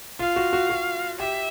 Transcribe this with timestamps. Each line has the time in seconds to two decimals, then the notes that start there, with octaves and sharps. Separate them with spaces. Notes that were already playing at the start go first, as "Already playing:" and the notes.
0.19 F4 F5
0.36 F#4
0.53 F#4
0.70 F#4
1.19 G4 E5